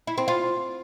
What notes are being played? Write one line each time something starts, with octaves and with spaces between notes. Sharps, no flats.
E4
C4
F4